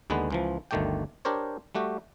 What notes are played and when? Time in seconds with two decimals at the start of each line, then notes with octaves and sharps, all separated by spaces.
0.10 D#2 D3 G#3 B3 B4
0.30 C#2 E3 F3
0.71 G1 D2 D#3 A3 D5 G5
1.25 D4 G4 A#4 C5 C#5
1.75 G3 A3 F#4 G4